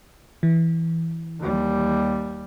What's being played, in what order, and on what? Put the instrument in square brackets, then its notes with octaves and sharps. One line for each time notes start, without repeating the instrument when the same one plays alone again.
[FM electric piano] E3
[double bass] D#2 G3